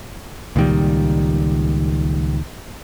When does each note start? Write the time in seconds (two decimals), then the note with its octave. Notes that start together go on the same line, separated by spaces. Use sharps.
0.56 C#2 A#2 D#3 G3